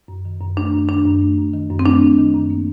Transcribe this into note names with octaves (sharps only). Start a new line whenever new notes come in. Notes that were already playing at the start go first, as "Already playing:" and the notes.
F#2
D#3
F#2
A3 D4
F#2
D#3 D4
F#2
A3
F#2
D#3
F#2
C4
A3 D4
F#2
D#3
F#2
A#3